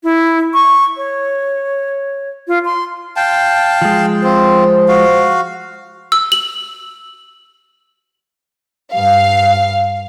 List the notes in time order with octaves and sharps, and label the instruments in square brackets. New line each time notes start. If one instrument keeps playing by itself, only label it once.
[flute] E4
C#6
C#5
F4
C6
[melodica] F5 G5 A5
[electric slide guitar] F3 G#3
[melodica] C4 F4 [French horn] C5
[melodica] F#4 F5
[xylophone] E6
F#7
[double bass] G2 [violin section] F5